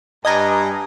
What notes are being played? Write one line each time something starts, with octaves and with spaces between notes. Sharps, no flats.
G2 D#5 G#5 A#5